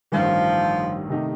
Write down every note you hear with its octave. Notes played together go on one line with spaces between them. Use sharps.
A1 G2 D#3 F3
C3 D#3 A3 D#4 G4